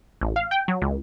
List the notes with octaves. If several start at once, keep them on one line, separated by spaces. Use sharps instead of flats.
A1
F5
G5
F#3
C#2